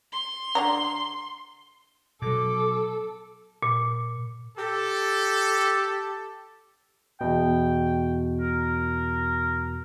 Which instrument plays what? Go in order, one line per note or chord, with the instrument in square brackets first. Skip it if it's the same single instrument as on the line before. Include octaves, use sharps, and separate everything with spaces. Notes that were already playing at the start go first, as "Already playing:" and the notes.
[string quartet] C6
[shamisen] D3 D5 A#5
[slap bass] B2 F#3 [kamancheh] A4 [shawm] D6
[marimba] A#2
[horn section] G4 A4
[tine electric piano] E2 B2 [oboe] G5
[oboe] A#4